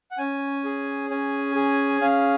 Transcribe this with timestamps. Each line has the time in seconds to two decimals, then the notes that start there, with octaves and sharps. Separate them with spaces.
0.11 F#5
0.18 C#4 G#5
0.64 G#4
1.10 C#4 G#5
1.55 G#4
2.01 C#4 F5